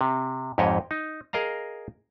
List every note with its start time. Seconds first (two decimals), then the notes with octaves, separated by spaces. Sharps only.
0.01 C3
0.58 F2 G#2 G4 C#5 D#5
0.91 D#4
1.33 G#4 A#4 D#5 F5 A#5